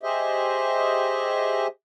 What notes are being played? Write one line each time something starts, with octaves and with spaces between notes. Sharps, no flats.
G4 G#4 C5 D#5 E5